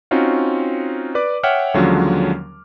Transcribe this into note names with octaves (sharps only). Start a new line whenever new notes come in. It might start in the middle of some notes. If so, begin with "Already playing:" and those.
C4 C#4 D#4 F4 F#4
B4 D5 D6
C#5 E5 F#5 G5 F6
D#2 D3 F3 F#3 G#3 C#4